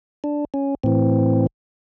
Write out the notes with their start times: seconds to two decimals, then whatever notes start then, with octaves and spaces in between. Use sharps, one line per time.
0.24 D4
0.54 C#4
0.83 A2 E3 C4